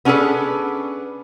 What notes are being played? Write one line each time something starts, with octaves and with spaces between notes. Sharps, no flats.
B3 C#4 D4 G#4 A4 B4